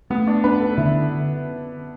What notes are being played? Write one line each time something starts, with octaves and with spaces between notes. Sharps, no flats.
A3 B3
D4
D4 B4
A4
D3 E4